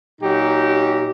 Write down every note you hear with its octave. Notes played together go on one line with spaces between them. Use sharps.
A#2 F#3 D#4 G4